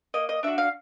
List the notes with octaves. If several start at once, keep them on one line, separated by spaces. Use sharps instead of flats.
A#3 D#5
D#5
D4 F#4 E5
F5